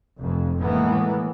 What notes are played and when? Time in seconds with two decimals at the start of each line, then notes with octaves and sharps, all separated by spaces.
0.19 F1 F2
0.61 A2 D#3 E3 G#3 A#3 B3